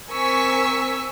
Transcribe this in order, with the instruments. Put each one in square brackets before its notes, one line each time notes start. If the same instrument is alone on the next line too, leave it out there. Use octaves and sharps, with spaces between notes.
[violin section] C4 A#4 G#5 C#6 E6 B6